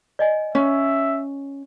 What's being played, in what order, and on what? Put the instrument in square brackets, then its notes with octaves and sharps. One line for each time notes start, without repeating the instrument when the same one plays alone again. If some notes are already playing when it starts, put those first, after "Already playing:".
[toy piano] D5 D#5 G#5
[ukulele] C#4 [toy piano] C#5 [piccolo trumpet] E5